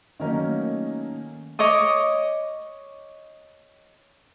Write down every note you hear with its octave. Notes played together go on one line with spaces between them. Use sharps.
D#3 F#3 A3 A#3 C#4 D#4
C#5 D#5 D6 D#6